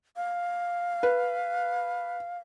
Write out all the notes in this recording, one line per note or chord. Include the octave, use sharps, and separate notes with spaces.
F5
B4